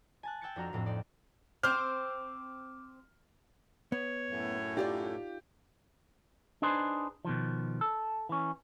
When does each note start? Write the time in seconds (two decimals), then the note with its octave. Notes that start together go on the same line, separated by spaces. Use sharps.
0.23 G#5 A5 F#6
0.41 G5 E6 F#6 G#6 A6 C#7
0.56 F2 D4 F#4 A#5 F6
0.73 F2 A2 C4
0.86 C4 D#4 D5
1.63 C4 C5 D6 F6
3.92 B3 C#5
4.30 F#2 A2
4.77 D#4 F4 G4 D5
6.62 D4 D#4 G#4 B4 C5
7.25 B2 D#3 F3
7.81 A4
8.29 E3 C#4